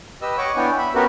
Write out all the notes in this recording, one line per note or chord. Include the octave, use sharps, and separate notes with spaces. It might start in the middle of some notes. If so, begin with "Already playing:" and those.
G4 B4 D#5 E6
C#5 D#5 F#5 C#6 D6
B3 D4 E4 C#5 G5 G#5
E5 B5
B3 C#4 F#4 G4 A#4 B4